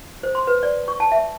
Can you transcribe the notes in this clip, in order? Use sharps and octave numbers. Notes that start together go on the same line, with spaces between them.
C5
C6
B4
D5
C#6
A5
E5